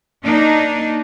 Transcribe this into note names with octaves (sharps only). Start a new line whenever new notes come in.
A#3 D4 D#4